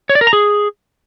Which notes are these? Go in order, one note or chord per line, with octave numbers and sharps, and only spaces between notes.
C#5
D5
A#4
A#5
G#4